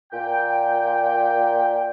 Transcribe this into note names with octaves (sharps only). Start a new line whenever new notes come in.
A#2 G5